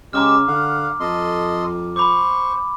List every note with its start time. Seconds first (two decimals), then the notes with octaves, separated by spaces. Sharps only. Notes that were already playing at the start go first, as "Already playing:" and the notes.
0.13 C#3 G#3 G4 A#5 D6 E6 F6
0.48 D3 F5 F#5
1.00 F2 A4 D#5 C6
1.96 C5 B5 C#6 D6